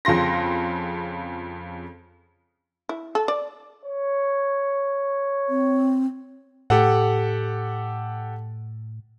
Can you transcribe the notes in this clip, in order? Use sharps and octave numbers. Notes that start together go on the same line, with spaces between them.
F2 C#3 F4 C6 A#6
E4
A4
D5
C#5
C4
A2 G4 A4 F#5